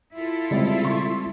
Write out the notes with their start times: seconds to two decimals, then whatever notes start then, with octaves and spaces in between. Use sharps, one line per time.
0.15 E4 F4 A4
0.51 C#3 G3 G#3 C4
0.85 C6 C#6